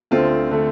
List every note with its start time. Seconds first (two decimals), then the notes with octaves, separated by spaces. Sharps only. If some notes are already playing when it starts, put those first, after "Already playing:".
0.11 D2 D3 A3 C4 F4
0.51 D3 A3